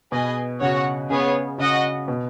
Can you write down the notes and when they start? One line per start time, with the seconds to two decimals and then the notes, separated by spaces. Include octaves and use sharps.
0.12 B2 G#4 B4 D#5 G#5
0.60 C#3 F#4 C#5 F#5
1.10 C#3 B3 G#4 C#5
1.58 C#3 F#4 D#5 F#5
2.08 B2